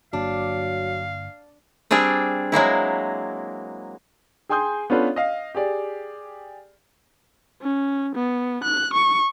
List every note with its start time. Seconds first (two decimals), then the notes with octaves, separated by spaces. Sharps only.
0.13 G1 F#3 A#3 D4 F5
1.91 G3 C4 D4 G#4
2.52 F#3 G#3 A#3 E4
4.49 G#4 G5 G#5 C6 D#6 G6
4.90 B3 C#4 D4 F4 A4 B4
5.16 D#5 F5
5.55 G4 G#4 D5
7.62 C#4
8.15 B3
8.64 F#6
8.94 C#6